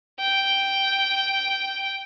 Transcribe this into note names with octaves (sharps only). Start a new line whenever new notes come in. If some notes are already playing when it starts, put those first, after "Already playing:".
G5